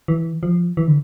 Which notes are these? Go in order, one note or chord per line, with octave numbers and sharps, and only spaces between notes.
E3
F3
E3
D3